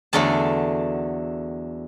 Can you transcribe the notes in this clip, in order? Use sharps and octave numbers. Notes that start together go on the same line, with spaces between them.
E2 D3 F#3 A3 A5